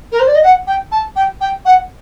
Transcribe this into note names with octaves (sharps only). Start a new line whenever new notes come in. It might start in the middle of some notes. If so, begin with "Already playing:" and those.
A#4
C5
D5
D#5
F#5
G5
A5
G5
G5
F#5